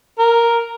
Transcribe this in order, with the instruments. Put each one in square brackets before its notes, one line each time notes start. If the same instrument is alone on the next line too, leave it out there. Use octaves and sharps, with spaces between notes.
[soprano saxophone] A#4